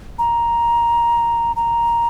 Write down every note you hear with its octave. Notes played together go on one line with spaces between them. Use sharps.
A#5
A#5